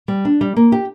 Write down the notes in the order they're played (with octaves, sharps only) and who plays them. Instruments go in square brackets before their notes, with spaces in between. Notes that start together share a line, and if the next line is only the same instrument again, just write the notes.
[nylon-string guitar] G3
D4
G3
A#3
G4